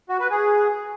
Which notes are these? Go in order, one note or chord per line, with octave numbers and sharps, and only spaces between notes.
F#4
B4
G#4